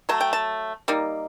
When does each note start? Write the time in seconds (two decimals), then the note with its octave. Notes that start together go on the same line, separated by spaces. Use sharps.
0.09 F#3 A3 A5
0.21 G5
0.33 A5
0.88 G3 A#3 D#4